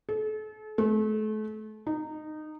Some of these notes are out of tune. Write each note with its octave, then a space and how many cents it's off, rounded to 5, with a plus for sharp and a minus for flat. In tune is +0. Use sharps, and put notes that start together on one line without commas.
A4 -35
A3 -35
D#4 -20